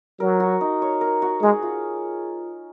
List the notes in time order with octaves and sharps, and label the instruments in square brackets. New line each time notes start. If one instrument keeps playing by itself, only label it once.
[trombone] F#3 [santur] A#4
[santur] F#4
D#4
C#5
A#4
F#4
[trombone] G#3 [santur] G#4
[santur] F4